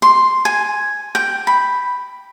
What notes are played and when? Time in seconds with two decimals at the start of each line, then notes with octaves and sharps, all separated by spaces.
0.02 C6
0.45 G#5
1.15 G5
1.47 B5